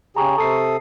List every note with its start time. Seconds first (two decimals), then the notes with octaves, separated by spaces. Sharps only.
0.16 C#3 G4 G#4 A#5 C#6
0.38 C3 A4 A5 D#6 C7